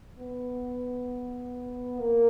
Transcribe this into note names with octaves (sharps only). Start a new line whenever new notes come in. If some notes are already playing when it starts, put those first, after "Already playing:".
B3
A#3